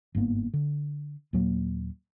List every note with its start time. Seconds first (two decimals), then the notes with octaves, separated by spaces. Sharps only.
0.15 G1 G#2 A#3 B3
0.54 D3
1.33 D#2 A#2 F#3 A#3